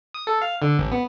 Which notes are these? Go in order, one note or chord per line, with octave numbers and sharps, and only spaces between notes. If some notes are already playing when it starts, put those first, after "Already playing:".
D#6
A4
F5
D3
A1
B3